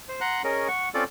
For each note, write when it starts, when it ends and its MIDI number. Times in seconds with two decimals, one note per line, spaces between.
0.09 0.20 72
0.21 0.42 78
0.21 0.42 82
0.21 0.42 84
0.21 0.42 90
0.44 0.68 61
0.44 0.68 68
0.44 0.68 70
0.44 0.68 73
0.44 0.68 75
0.68 0.89 78
0.68 0.89 85
0.94 1.04 60
0.94 1.04 61
0.94 1.04 65
0.94 1.04 69
0.94 1.04 74